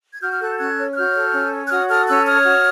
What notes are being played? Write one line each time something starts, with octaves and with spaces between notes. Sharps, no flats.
G#6
F#4 F6 G6
F6
A4 F#6
G6
C#4 F#6 G#6
C#5
F#6
F#4 F6 G6
A4
C#4
C#5
F#6
F#4 D#6 F6
A4 D#6 F6
C#4 E6 F#6
C#5 D#6 F6
F#4